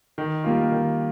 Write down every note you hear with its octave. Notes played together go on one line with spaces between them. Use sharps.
D#3
G3 A#3 F4
D#3